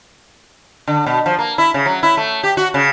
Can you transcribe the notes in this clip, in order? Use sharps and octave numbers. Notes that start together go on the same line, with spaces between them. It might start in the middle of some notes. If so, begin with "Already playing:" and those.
D3
B2
F3
A#3
E4
C#3
F#3
E4
A3
G4
F#4
C#3